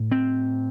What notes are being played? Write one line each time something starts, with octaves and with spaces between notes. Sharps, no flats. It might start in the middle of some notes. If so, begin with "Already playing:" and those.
Already playing: A2
C4